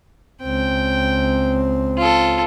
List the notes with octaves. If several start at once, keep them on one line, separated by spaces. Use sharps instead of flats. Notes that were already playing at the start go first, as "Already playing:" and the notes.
C#2 C4 G5
F4 A4